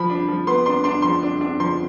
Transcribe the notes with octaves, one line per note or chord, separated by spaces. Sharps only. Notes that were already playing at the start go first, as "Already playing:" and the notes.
Already playing: F3 B5
D4
F3
B3 C6
D4 C6
D4 C6
F3 C6
D4
D4
F3 C6